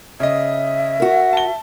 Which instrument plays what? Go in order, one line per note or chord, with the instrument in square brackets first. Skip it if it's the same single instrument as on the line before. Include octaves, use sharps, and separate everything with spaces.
[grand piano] C#3 D#5 [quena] E5
[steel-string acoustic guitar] F#4 A#4
[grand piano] A5 G7